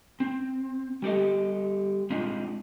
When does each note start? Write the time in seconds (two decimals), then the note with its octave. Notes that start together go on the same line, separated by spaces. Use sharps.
0.20 C4
1.02 G3 G4 A4 D#5
2.10 G#3 C4 D4 D#4 F4